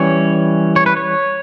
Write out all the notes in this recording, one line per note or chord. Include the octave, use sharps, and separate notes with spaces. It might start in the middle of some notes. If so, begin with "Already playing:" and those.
Already playing: E3 G3 C#4 C#5
C#5
B4
C#5